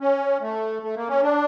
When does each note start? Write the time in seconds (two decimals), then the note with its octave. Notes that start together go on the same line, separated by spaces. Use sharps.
0.01 C#4
0.41 A3
0.83 A3
0.96 A#3
1.09 C#4
1.23 D4